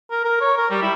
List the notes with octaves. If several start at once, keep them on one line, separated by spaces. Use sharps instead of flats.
A#4
A#4
C#5
A#4
G3
E4